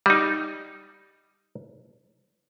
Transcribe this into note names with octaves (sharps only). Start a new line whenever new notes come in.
G3 D#4